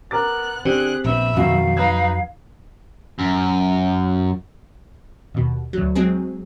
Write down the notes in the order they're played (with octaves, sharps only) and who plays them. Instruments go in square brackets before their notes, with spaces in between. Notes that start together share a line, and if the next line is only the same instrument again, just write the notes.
[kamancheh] B3 F#6 [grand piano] A#4 D6 A6
[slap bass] D3 [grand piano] C4 G4 [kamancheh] G#4 F#6
[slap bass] A#1 B3 [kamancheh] E5 B5
[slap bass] F2 F#3 [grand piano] B2 D#3 [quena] F5
[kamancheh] D#4 B4 [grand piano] G#6
[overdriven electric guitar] F#2
[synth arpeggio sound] D#2 B2
D2 F#3
F#3 G#3 C4 G#4